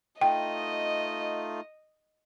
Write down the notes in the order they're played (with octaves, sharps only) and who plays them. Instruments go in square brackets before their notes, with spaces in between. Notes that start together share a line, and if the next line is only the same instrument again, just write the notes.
[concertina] A3 D#4 F4 [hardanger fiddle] D#5 [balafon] G5